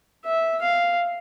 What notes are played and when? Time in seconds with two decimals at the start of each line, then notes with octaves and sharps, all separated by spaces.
0.25 E5
0.62 F5